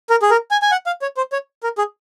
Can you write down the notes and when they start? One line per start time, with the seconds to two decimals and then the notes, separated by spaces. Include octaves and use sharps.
0.10 A#4
0.22 G#4
0.31 A#4
0.51 G#5
0.62 G#5
0.72 F#5
0.86 F5
1.02 C#5
1.17 C5
1.32 C#5
1.63 A#4
1.78 G#4